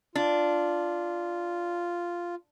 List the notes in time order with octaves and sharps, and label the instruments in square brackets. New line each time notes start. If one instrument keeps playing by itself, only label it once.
[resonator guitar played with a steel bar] D4 [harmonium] F4